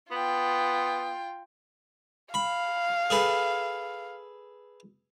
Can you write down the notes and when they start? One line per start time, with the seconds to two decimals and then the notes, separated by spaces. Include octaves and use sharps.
0.11 B3 F4 G5
2.34 F5 B5
3.10 G#4 A4 B4